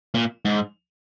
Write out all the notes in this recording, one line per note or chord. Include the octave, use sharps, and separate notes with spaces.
A#2
G#2